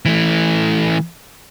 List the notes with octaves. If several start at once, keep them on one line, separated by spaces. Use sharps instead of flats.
E3 A3